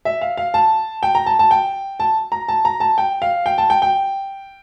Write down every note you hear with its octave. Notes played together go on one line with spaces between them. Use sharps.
E5
F5
F5
A5
G5
A#5
A5
A5
G5
A5
A#5
A5
A#5
A5
G5
F5
G5
A5
G5
G5